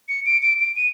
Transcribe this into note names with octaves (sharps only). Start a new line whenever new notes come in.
C#7
D7
D7
D7
D#7